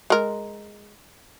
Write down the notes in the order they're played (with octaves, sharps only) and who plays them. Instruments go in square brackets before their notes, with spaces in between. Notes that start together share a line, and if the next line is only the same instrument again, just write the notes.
[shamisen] G#3 A#4